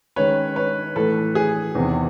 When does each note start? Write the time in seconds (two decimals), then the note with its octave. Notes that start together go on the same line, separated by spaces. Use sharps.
0.16 D#3 G#3 C#4 B4 C#5
0.56 B4 C#5
0.96 A2 E3 A3 A4 B4
1.35 G#4
1.75 E2 C3 D#3